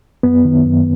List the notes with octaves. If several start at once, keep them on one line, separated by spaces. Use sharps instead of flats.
F#2 B3
D#3
F#2